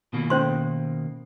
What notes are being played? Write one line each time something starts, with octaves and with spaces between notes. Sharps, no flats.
B2 D#3 A#3
C#4 C5 C6